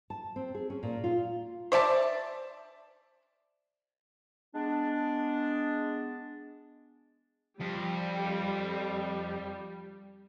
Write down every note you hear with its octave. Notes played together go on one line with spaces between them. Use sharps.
A5
C4
G#4
C#4
A#2
F4
C5 D5 E5 A5
G#3 B3 D4
F2 G3